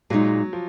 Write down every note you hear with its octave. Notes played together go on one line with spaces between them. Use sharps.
A#2 F#3 G#3 D#4
F3